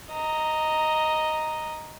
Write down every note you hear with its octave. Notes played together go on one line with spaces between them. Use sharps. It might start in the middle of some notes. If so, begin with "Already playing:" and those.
D#5 A#5